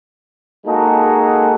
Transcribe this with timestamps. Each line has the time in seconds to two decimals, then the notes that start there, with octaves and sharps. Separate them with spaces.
0.66 G#3 A#3 D#4 F#4 G#4 A4